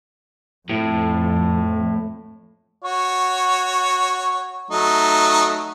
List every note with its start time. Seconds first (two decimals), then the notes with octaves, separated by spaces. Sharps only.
0.70 F2 A2
2.83 F#4 C#5
4.71 F#3 A3 D#4